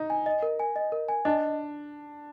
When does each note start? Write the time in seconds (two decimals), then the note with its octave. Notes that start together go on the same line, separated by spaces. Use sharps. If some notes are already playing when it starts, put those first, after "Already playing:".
Already playing: D#4
0.10 G#5
0.26 D#5
0.43 A#4
0.59 G#5
0.76 D#5
0.92 A#4
1.09 G#5
1.25 D4 D#5